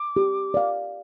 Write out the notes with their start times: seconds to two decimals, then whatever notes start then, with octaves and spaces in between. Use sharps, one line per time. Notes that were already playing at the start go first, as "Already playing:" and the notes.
Already playing: D6
0.16 G4
0.54 D5 F5